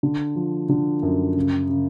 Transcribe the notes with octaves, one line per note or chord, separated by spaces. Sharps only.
D3
F3
D3
F#2
C#3
C#3